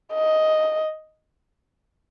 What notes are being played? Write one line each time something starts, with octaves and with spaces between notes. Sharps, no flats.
D#5